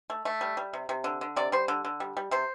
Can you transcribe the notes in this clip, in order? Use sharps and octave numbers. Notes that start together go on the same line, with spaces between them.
A3
A3
G3
G3
C3
C3
D3
D3
C3 D5
G3 C5
D3
D3
G3
G3
C3 C5